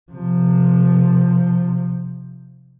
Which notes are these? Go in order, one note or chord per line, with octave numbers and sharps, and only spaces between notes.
C3 F3